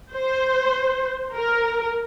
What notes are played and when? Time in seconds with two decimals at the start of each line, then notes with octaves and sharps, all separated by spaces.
0.13 C5
1.34 A#4